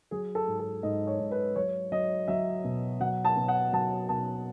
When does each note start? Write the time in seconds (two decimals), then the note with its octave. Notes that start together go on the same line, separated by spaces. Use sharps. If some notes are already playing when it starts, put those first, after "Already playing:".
0.11 F#3 G#4
0.35 A4
0.47 G#2
0.59 A4
0.83 G#2 D#5
1.07 C#5
1.19 G#2
1.31 B4
1.56 F#3 C#5
1.92 F#3 D#5
2.28 F#3 E5
2.64 B2
3.00 F#3 F#5
3.25 A5
3.37 B2
3.48 F#5
3.72 F#3 A5
4.09 B2 A5